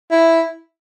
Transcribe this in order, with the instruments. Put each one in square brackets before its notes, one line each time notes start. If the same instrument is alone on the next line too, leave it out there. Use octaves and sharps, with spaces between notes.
[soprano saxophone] E4